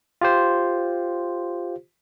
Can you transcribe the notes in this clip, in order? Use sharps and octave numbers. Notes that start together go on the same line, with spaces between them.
F4 G4 C5